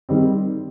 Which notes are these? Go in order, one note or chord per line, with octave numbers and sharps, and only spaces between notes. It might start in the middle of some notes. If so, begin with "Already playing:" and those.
D#3 G3 C4